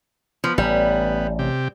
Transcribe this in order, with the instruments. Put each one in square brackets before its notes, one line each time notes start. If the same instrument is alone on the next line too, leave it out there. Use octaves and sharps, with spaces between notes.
[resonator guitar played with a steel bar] F3 [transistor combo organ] B3
[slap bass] A1 [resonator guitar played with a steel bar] G3
[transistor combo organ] C3 G4